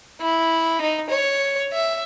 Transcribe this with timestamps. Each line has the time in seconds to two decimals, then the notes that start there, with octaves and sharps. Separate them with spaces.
0.21 E4
0.81 D#4
1.10 C#5
1.73 E5